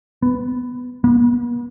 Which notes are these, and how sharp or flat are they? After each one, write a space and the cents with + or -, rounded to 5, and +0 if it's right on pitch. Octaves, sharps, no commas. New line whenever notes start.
B3 +10
B3 -45